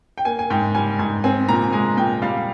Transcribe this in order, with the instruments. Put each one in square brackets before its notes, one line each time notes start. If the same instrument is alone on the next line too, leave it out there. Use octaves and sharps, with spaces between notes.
[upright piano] G5
A#3 G#5
G#5
G#2 G5
G3 G#5
G#2 G#5
C4 G#5
A#2 A#5
G#3 G#5
A#2 G5
G3 F5